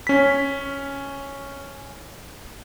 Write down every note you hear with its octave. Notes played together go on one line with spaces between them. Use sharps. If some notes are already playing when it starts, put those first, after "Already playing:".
C#4 B6